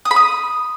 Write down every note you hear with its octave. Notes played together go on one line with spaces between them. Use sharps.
D#6
B5
D#6